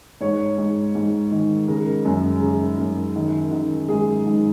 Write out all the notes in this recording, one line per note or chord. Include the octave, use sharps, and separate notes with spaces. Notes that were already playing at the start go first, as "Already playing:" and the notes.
G#2 C#5
G#2
G#2
D#3
C#3 A#4
F#2
C#3
F#2
D#3
D#3
G#2 G#4
G#2